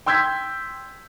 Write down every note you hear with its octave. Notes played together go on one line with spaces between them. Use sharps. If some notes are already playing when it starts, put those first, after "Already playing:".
G5 C6 E6 G6 G#6 B6